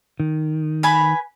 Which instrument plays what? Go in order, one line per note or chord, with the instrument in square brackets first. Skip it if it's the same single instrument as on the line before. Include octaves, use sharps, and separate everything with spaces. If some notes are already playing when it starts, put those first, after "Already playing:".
[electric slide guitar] D#3
[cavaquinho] B4 G#5 B5